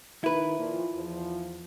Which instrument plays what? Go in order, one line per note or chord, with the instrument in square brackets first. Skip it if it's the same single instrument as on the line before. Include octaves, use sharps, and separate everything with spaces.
[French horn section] D#3 D#4 [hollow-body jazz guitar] E4 B4
[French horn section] A#2 F3
E2 F3